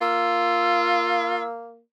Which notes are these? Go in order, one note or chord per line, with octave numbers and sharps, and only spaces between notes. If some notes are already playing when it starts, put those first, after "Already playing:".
A#3 F4 E6